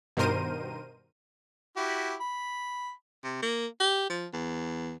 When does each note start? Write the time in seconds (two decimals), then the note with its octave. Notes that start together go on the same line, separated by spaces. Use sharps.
0.17 G2 B2 D#3 A#4 C5 D#7
1.77 E4 F#4 G4
2.20 B5
3.23 C3
3.42 A#3
3.80 G4
4.10 F3
4.33 E2